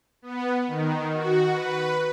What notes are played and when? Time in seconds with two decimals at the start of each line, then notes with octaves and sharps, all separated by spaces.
0.22 B3
0.68 D#3
1.13 F#4
1.53 B4